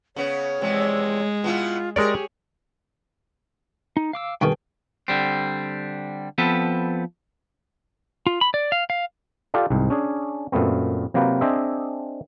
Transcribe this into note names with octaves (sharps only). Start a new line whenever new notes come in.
C#3 B3 C#5
E2 C3 F3 G#3
B2 B3 E4 F4
G#3 G4 G#4 A#4 C#5 D5
D#4
F5 D6 E6
G2 B2 D#3 G#4 A4 G5
D3 G3 C4
F3 B3 C4 A4 B4
F4
B5
D5
F5
F5
F4 G4 A4 D5
C2 G#2
C#4 D4 G#4
F#2 A#2 A3 B3 C4
C3 F#3 A#3 F4 B4 G5
C4 D4 G#4 C5 D#5 E5